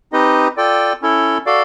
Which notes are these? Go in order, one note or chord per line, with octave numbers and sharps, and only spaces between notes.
C4 D#4 G4 B4 D#5
F4 A4 D5 G5
C#4 E4 A4
F#4 A4 D5 F5